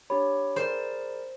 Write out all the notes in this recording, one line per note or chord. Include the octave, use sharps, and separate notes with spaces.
D4 G4 C#5 B5
G#4 A#4 C5 D5